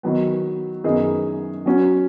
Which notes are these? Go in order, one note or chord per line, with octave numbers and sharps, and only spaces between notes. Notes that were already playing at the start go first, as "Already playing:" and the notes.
D#3 F#3 B3
F#2 D#3 B3 D#4 G#4
F#3 C#4 F#4